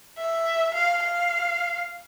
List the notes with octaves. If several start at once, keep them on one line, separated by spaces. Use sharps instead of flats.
E5
F5
F5